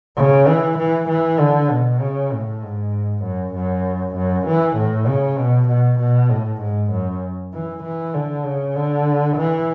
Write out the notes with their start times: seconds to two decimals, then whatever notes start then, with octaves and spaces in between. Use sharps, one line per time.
0.17 C#3
0.47 E3
0.78 E3
1.09 E3
1.40 D3
1.70 B2
2.01 C#3
2.32 A2
2.62 G#2
3.23 F#2
3.54 F#2
4.16 F#2
4.46 E3
4.77 A2
5.08 C#3
5.38 B2
5.69 B2
5.99 B2
6.30 A2
6.61 G#2
6.92 F#2
7.53 E3
7.84 E3
8.14 D3
8.45 C#3
8.76 D3
9.37 E3